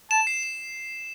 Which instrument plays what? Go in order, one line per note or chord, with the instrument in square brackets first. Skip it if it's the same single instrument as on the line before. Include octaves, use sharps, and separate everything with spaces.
[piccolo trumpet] A5 [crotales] E7
[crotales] C7
E7